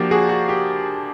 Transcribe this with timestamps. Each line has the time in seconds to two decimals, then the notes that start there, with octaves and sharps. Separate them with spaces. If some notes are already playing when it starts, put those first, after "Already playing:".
Already playing: F3 A#3 D4 F#4 G4
0.11 F#4 G#4
0.29 F#4
0.49 G4